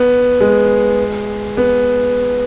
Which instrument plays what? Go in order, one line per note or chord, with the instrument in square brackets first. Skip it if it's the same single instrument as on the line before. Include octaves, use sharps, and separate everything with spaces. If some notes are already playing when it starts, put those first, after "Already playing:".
Already playing: [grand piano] B3
G#3
B3